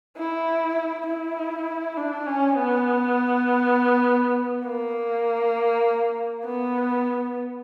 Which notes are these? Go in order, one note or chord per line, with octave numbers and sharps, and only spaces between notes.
E4
E4
D4
C#4
B3
A#3
B3